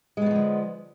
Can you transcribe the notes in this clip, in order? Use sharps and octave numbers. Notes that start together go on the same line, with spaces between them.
D3 F3 F#3 G#3 B3